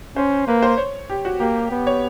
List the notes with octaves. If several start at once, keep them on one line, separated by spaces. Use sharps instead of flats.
C#4 C5
A#3 B4
C5
C#5
G4
F#4
A#3 G4
B3
C#5